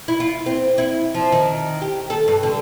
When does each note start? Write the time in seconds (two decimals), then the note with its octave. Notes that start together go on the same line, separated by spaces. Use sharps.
0.08 E4
0.20 F4
0.46 C4
0.78 E4
1.15 F3
1.32 D#3
1.82 G4
2.10 A4
2.28 G2
2.43 D3